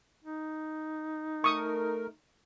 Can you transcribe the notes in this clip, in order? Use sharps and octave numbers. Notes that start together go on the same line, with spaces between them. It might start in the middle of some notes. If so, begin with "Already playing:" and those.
D#4
A3 A#4 C#6 D#6